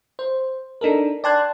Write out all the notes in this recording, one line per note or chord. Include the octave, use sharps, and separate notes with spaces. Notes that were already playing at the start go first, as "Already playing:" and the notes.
C5
D4 D#4 A4 A#4
D5 G5 A5 C6 F#6 G#6